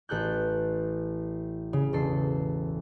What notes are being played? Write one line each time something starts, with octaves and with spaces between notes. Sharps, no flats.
A1 A4 F#6 G6
C#3
E1 A4 C7